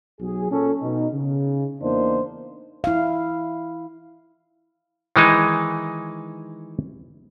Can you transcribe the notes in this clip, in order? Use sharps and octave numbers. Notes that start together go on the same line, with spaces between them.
B1 F#3 G#4
A#2 C#4 A4
B2 D#4
C#3
E2 A#3 D4 D#4 C5
E4 F5
D#3 E3 G#3 D#4